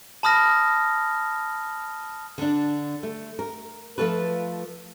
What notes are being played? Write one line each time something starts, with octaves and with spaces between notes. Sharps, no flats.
A5 B5 D#6 F6 A#6
D3 D4
A3
A#4
F3 A3 F4 A4 B4